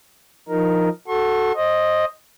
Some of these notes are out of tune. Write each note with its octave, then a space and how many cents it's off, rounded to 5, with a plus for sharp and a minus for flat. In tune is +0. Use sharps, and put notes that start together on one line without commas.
F3 +0 D#4 +0 A#4 +0
F#4 +0 A4 +0 C#6 -45
C5 +20 D#5 +0